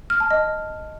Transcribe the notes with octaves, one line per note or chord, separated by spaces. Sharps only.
F6
A5
D#5